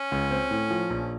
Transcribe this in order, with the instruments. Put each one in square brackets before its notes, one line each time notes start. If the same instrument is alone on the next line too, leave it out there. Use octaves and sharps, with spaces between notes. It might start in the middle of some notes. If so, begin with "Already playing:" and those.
Already playing: [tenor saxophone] C#4
[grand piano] C#2
C4
A2
F3
A#1